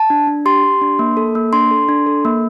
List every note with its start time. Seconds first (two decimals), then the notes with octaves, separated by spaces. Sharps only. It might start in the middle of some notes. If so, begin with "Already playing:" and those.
Already playing: A5
0.10 D4
0.27 D4
0.46 G4 C6
0.64 G4
0.81 D4
0.99 A#3
1.17 A4
1.35 A#3
1.53 D4 C6
1.71 A4
1.89 D4
2.07 A4
2.25 A#3